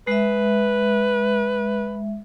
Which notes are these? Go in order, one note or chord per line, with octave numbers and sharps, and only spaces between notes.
G#3 B4 E5